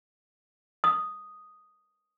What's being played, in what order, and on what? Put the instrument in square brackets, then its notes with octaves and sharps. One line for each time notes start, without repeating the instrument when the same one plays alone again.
[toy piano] D#6